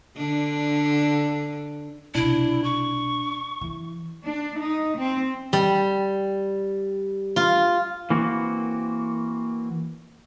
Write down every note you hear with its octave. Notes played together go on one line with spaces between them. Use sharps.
D3 D4
B1 C3 D4 E4
C#6
E3
D4
D#4
C4
G3
F4
E3 A#3 C4 F#4